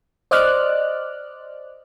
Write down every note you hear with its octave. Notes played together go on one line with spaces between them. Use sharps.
C5 D5 D#5 D6 F6 F#6